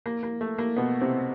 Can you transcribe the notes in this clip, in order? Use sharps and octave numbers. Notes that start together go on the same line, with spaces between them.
A#3
A#3
A3
A#3
B2 B3
C3 C4